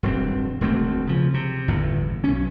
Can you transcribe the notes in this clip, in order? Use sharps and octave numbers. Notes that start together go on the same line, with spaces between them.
E1 G2 C4
E1 D2 A3 C4
C#3 F3
C3
G1 E2 A2
B1 C#4